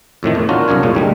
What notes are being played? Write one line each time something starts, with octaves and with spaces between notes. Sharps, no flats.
F2 A2 D#3 A3
E2
C#4 D4 F4 F#4 A#4
C2 F#2 D4 A#4 C#5
A#2 G#3 D#4
D2 G3 G#3